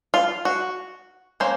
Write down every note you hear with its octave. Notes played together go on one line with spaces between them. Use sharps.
F4
F#4
A#3 C#4 C5